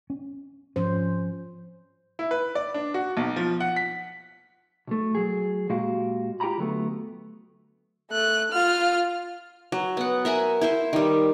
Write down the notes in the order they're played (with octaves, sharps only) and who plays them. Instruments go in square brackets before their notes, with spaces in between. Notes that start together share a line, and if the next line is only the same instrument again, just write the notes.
[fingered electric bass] C#4
[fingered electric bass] G#2 [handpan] F3 C#4 C5
[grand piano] E4
B4
D5
D4
F#4
B1
F3
F#5
B6
[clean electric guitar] B1 A3
F#3 G#4
A#2 G#3 A#3 F#4 G4 F5
F4 G4 G5 G#5 A#5 B5
D3 F#3 A3 B3
[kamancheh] A3 F#6
F4 F6
[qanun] F#3
B3 F#5
A#4 E5 F#5 G#5
E4 C5 E5
D#3 G3